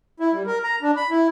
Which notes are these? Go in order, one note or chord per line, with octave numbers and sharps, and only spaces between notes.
E4
G3
A#4
A#5
D4
B5
E4